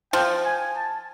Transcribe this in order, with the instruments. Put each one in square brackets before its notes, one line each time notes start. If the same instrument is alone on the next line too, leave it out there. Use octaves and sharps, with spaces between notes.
[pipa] F3 [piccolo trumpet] G5
[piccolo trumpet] G#5
A5